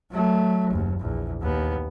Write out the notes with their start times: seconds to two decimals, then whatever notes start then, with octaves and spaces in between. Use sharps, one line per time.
0.11 F#3 A3
0.70 F#1 D#2
1.00 A#1 E2
1.41 D#2 B3